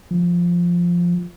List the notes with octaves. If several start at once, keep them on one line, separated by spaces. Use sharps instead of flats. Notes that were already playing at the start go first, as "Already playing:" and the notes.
F3